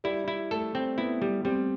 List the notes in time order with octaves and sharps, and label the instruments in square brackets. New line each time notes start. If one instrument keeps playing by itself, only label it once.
[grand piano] G3 [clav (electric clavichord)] E4
[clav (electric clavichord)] E4
[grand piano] A3 [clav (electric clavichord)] A4
[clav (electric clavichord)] C4
[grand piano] B3 [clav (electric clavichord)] E4
[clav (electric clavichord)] G3
[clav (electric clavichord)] G3 [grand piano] C4